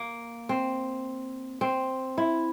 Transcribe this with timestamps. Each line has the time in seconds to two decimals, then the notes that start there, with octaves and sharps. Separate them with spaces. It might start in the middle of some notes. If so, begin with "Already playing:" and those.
Already playing: A#3
0.49 C4
1.61 C4
2.18 E4